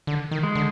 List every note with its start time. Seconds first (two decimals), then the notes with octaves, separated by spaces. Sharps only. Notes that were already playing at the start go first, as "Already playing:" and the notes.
0.07 D3
0.31 D#3
0.43 G#3
0.55 D3